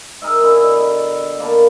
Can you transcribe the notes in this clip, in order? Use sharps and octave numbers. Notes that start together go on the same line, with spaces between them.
G#4 A#4 D#5 E5
B2 D3 E4
A#3 B3 A5